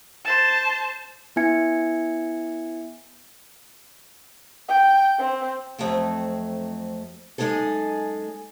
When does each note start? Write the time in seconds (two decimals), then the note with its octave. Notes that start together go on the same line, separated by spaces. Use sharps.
0.25 C5 A5
1.36 B3 E4 E5 G#5 G#6 C#7
4.68 G5
5.18 C4
5.78 F2 F#3 A3 C4
7.38 F#2 G#3 B3 D#4 G#4 A4